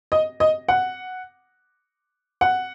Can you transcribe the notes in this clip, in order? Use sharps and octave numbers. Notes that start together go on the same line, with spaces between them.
D#5
D#5
F#5
F#5